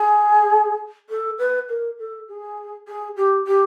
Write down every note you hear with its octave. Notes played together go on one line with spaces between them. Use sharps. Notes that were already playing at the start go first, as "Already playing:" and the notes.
Already playing: G#4
A4
B4
A#4
A4
G#4
G#4
G4
G4